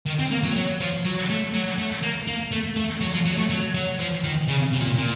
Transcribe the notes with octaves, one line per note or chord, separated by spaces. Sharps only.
D#3
C4
A#3
F#3
F#3
F3
F#3
A3
F#3
A3
A#3
A#3
A3
A3
F#3
F3
F#3
A3
F#3
F#3
F3
D#3
C#3
C3
A#2
A#2